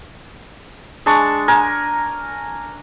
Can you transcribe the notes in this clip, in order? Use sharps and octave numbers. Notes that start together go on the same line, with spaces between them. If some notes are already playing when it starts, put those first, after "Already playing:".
G#3 D4 A5 C#6
A#4 G#5